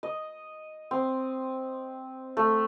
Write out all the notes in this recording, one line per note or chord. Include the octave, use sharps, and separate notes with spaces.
D#5
C4
A3